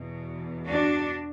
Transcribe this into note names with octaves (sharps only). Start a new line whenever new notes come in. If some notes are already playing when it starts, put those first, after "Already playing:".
Already playing: E2 B2
D4 F#4